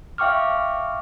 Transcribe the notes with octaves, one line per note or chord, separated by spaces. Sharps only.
E5 F5 G5 C#6 D6 F6